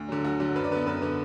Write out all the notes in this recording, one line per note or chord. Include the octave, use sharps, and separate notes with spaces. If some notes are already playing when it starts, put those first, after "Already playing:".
Already playing: D2
D3 F#3
D2 F#4
D3 F#3
F#2 B4
D5
D3 B3 B4
F#2 B4
D3 B3